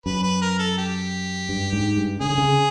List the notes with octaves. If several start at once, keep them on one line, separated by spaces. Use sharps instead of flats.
F#2 B4
B4
A#4
A4
G4
G2
G#2
G2
C#3 G#4
D3
C#3